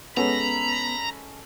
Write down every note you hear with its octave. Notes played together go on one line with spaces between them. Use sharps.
G#3 B3 C#4 A4 A#5 B5